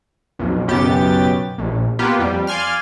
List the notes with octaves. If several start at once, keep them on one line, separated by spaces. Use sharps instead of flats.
B1 F2
B1 F#2 C#3 B3 G4 A6
A#1
A#3 B3 F4 G4 B4
F2 G3
D5 F5 G#5 C6 F6